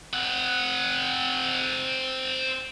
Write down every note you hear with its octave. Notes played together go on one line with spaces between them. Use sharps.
C4 F#5